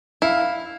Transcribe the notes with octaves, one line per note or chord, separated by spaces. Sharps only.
E4 F5